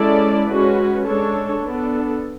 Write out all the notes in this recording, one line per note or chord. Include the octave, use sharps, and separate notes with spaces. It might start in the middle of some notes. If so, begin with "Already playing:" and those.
Already playing: G#3 C#4 E4 A4 D5
G#3 C#4 F#4 B4
G#3 D4 A4 C#5
B3 D4 A4